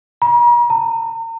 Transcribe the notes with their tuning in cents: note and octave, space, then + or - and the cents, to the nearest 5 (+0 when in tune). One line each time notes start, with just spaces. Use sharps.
A#5 +45
A#5 -40